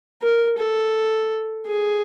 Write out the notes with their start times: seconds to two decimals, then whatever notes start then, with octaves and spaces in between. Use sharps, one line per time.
0.22 A#4
0.58 A4
1.67 G#4